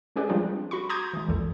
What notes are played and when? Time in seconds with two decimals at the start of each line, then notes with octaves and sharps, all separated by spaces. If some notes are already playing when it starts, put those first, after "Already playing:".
0.16 G#3 C#4 G4 G#4 B4 D5
0.29 F3 G3 C4 D4 F4 G4
0.71 F#4 B5 C#6
0.89 A#5 C6 D6 D#6 G6 G#6
1.13 E3 G#3
1.28 A#1 F2 E3 A4